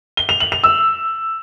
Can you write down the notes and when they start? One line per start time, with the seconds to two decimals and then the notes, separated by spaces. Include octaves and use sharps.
0.17 G7
0.29 F7
0.40 F#7
0.52 F7
0.64 E6